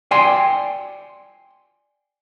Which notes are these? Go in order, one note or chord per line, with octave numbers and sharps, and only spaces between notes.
D5 G5 G#5 C6